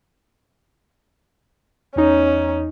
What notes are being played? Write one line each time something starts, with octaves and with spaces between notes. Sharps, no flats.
E2 C#4 D#4